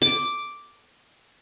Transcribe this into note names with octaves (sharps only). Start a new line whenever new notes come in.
D6